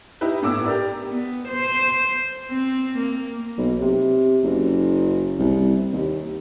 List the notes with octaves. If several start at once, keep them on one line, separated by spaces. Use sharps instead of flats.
D#4 E4 G4 B4
A2 B3 D6 E6
G4 A#4 D5
B3
C5
C4
A#3
B1
C3
F#1
C2
D#2